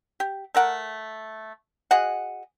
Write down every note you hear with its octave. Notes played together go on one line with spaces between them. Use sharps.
G4
A3 A#4 F#5
F#4 G#4 D#5 F#5